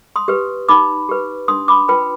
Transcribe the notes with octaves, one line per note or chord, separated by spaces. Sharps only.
C6 D#6
G4 B4
D#4 B5 D6
G4 B4
D4 C6 D#6
B5 D6
F4 B4 G5 B5